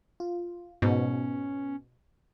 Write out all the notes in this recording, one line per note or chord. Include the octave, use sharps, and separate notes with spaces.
F4
G#2 B2 B3 C#4